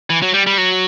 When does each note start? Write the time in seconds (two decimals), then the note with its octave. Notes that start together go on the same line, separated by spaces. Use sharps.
0.10 E3
0.22 F#3
0.34 G3
0.47 G3
0.58 F#3